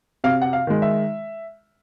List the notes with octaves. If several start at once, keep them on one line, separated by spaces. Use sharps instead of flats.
C3 F5
F#5
F5
D#3 G#3
E5